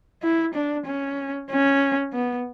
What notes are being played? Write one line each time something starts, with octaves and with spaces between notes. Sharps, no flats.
E4
D4
C#4
C#4
B3